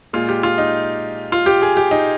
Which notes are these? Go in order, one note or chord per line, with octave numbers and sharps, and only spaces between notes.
A#2 G#3 F4
G4
F4
D#4
F4
G4
G#4
G4
D#4